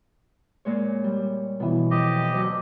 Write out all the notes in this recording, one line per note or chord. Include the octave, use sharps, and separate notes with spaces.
A#2 G#3 C#5
G3
B2 E3 B3
F2 G4 D#5
D2 F#3